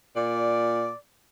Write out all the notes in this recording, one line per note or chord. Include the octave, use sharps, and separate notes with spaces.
A#2 D5